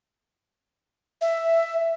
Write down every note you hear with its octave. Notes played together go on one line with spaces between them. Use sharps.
E5